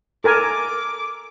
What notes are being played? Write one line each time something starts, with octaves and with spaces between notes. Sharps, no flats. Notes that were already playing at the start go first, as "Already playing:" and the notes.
A4 A#4 G#5 D6